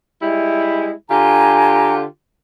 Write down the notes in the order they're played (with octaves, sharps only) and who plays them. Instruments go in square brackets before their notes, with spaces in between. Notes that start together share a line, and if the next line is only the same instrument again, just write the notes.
[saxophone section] G3 G#3 E4
[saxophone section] D3 F4 G4 [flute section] G#5 A#5